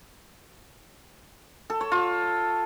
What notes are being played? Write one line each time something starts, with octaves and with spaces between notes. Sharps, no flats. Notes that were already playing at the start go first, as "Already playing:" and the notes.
A4
C#5
F4